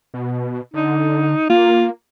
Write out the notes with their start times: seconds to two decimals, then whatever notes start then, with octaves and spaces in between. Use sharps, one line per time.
0.14 B2
0.74 D3 D#4
1.50 A#3 F4